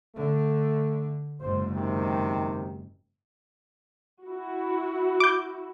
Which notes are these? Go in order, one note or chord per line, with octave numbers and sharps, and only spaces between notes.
D3 A3
F#1 G#2 C5
C3 D#3
E4 F#4
D6 G6